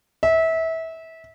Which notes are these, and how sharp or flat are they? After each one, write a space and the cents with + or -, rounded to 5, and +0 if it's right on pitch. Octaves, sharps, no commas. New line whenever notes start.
E5 -25